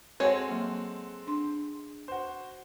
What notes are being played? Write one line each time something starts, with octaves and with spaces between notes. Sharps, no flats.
G#3 C4 F#4 A4 C#5 D#5 F#5
F#3 A#3
D4 C6
F#4 C5